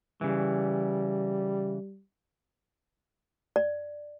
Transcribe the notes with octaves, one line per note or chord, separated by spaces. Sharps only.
C#3 E3 G3
D5